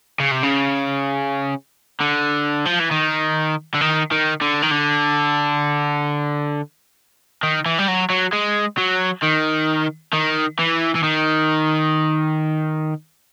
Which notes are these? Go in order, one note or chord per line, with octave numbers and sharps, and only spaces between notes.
C#3
C3
C#3
D3
F3
E3
D#3
D3
D#3
D#3
D3
D#3
D3
D#3
E3
G3
F#3
F#3
G#3
F#3
D#3
D#3
E3
E3
D#3